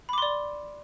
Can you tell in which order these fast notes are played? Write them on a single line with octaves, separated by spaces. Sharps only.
B5 D6 C6 D5